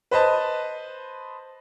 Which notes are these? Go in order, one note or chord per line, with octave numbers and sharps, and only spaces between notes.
B4 C5 D#5 A5